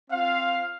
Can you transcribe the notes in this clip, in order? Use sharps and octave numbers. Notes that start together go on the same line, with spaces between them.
C4 F4 F5